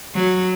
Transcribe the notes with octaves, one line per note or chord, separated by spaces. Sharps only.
F#3